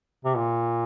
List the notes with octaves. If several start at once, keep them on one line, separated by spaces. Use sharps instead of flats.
C3
A#2